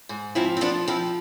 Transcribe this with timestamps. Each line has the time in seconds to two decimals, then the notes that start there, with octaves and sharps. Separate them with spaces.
0.09 G#2
0.35 F3 C4 E4
0.57 C4
0.61 F3 B3 D4
0.88 F3 C4 E4